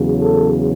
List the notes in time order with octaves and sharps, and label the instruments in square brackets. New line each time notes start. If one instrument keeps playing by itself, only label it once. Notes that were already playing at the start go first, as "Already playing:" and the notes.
Already playing: [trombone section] E2 C#3 F#3
A4